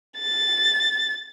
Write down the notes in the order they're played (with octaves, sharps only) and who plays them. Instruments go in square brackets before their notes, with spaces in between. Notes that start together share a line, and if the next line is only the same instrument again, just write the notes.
[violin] A6